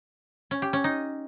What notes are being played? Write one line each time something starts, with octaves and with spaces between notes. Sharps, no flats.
C#4
G4
C#4
D#4